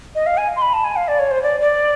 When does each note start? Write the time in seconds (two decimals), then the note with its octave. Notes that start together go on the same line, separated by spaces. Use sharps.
0.15 D#5
0.26 F5
0.37 G#5
0.56 C6
0.62 B5
0.74 A5
0.85 G#5
0.96 F5
1.08 D5
1.19 C#5
1.31 C5
1.43 D5
1.61 D5